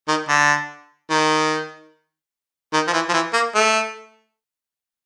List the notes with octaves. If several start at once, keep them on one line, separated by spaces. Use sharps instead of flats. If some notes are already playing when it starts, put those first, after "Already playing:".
D#3
D3
D#3
D#3
F3
E3
F3
E3
A#3
A3